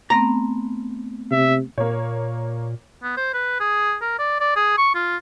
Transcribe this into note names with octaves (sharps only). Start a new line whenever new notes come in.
A3 B3 C4 A#5
C3 E5
A#2 A#3 C#5
B3
C5
B4
G#4
A#4
D5
D5
G#4
C#6
F4